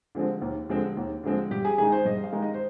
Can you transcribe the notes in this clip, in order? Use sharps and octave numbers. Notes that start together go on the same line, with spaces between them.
D3 F3 G#3 C4
D#2
D3 F3 G#3 C4
D#2
D3 F3 G#3 C4
G2 G4
G#4
D#3 G#3 D#4 G#4
C5
G2 D#5
F5
D#3 G#3 D#4
D#5
C5